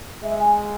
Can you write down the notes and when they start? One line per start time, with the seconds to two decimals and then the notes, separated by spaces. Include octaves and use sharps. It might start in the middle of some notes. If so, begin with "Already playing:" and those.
0.23 G#3 E5
0.39 G#5